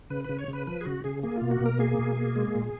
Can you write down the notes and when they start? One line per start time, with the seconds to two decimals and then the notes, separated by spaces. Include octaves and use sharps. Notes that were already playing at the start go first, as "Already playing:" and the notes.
0.10 C#3 B4
0.24 C#3 B4
0.39 C#5
0.48 C#3
0.53 B4
0.67 F3 B4
0.81 G#4
0.85 C#3 F#4
1.04 C#3 G#4
1.23 A#3 G#4
1.37 B2 F4
1.51 F#4
1.61 B2 A#4
1.79 A#3 G#4
1.99 B2
2.17 A#3
2.36 G#3
2.55 A#2